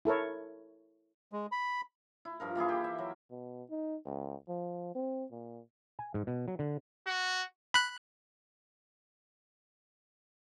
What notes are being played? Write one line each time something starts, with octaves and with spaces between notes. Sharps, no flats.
E4 A4 A#4 C#5
G#3
B5
E4
G2 F3 A#4
E3 A#3 E4 G#4
G4
E5
F#3
B2
D#4
C#2
F3
C4
A#2
G#5
G#2
B2
F#3
D3
F#4
B5 F#6